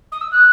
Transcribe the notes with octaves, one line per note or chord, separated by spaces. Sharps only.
D#6
E6
F#6